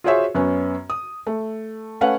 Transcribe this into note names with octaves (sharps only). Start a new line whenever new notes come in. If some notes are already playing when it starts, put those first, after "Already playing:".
F4 F#4 G#4 C5 C#5 E5
F#2 B3 C#4
D#6
A3
A3 C#4 B4 F5 F#5